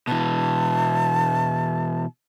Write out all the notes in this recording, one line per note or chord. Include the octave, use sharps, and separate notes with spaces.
B2 E3 A5